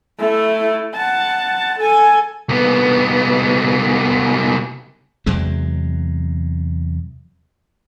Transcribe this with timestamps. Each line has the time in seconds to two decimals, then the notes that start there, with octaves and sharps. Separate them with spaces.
0.19 A3 E4
0.95 F#5 A5
1.78 A4 G#5
2.49 C2 B3
5.26 E2 C3 F#3 G#3